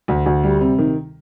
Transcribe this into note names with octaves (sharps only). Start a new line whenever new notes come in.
D2
D2
G3
C3
D#3